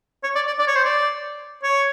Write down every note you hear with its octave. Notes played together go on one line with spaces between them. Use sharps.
C#5
D5
D5
D5
C#5
C5
D5
C#5